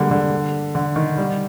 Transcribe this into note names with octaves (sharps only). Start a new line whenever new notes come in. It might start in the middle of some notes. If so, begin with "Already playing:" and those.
Already playing: D3 G3 G#3 A#3
D3
D3
D#3
G3